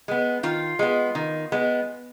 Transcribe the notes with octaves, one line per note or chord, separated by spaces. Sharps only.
G#3 B3
D#3 F4
G#3 B3
D#3
G#3 B3